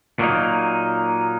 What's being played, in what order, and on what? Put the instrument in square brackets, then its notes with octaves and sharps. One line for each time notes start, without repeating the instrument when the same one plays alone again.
[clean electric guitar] A#2 F#3 A#3 D#4